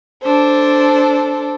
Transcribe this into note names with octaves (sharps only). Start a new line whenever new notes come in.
D4 A4 C5